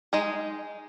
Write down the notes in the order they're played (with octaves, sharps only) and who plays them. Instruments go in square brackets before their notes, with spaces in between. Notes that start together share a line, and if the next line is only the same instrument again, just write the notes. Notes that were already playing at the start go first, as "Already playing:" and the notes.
[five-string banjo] G#3 D#4 G#4